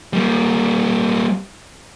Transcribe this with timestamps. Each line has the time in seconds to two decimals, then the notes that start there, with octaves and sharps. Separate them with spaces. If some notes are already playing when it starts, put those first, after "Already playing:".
0.13 G3 A#3